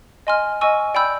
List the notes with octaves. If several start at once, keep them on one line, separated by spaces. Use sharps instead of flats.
D#5 G#5 C6 F6
D#5 G#5 C#6 E6
D5 G5 B5 E6 G6